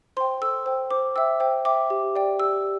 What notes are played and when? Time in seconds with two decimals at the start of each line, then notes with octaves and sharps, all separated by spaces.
0.17 C5 C6
0.20 G5
0.41 A4 E6
0.66 C5 G5
0.91 C5 D6
1.16 E5 G5 E6
1.40 C5 G5
1.65 E5 G5 D6
1.90 G4
2.16 D5 G5
2.39 G4 E6